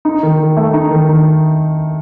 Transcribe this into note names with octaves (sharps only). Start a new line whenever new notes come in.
D#4
D#3
D#3
A3
D#4
D#3
D#3